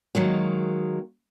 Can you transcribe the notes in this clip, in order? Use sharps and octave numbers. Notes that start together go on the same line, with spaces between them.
D#3 F#3 G#3 A#3